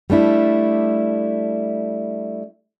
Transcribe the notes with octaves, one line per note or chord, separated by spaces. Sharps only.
G3 A3 D4 E4